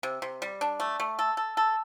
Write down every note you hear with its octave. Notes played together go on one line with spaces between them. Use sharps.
C3
C3
G3
D4
A3
A3
A4
A4
A4